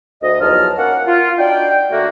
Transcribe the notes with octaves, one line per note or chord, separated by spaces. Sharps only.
D2 D#5
E2 F3 F#3 D#4 A5 F6
A#3 C#4 F#5
F4
D4 D#4 F#4 D5 G5
D3 A3 A#3 F#4